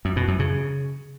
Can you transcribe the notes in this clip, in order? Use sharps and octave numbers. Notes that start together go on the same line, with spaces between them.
F#2
B2
F#2
C#3